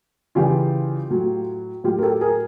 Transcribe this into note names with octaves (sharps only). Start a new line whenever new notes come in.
C#3 E3 G3 F4 G4
A2 F#3
A2 F#3 F4 G4
A#4
G4 A4
G#4 A#4